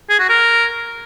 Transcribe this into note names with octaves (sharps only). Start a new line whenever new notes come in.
G#4
F#4
A#4